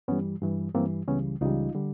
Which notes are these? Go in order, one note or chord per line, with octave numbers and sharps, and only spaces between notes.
G2 E3 G3 B3 C#4
G2 E3 G3
G2 E3 G3 A#3 C4
C#2 C#3 E3 G3 B3 C#4
C#2 C#3 E3 G3 D#4 F4
D3 G3